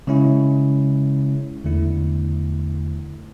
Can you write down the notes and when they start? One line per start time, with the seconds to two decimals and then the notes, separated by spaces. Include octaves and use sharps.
0.07 C#3 G#3 C#4 E4
1.65 E2 D3 A3 E4